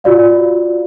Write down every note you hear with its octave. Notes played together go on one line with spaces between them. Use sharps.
F4 F#4 D5 F5